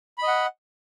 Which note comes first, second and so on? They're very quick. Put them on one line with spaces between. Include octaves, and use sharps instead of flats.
B5 D#5 F#5